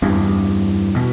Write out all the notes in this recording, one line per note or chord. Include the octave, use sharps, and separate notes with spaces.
E2 G2
B2